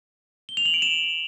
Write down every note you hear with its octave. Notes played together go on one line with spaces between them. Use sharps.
G7
F7
F#7
D7
E7